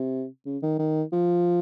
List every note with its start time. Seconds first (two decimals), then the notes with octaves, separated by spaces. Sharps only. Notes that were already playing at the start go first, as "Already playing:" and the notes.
Already playing: C3
0.46 C#3
0.62 D#3
0.79 D#3
1.13 F3